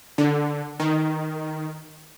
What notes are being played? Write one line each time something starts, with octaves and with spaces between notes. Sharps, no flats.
D3
D#3